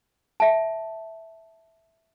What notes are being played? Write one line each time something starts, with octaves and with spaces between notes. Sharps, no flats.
E5 A5